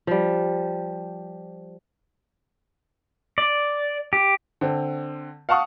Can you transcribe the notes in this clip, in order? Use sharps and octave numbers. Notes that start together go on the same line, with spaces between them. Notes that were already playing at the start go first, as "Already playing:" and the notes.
F3 G3
D5
G4
D3 C4
F5 F#5 A5 C#6 D#6